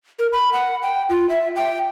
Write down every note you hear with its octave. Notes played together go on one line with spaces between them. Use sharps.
A#4
B5
F#5
G5
F4
E5
G5